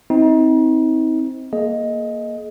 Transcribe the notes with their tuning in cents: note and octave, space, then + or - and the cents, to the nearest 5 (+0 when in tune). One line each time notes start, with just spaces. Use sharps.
C4 +0 D#4 +35
A#3 +5 G#4 +35 D#5 +5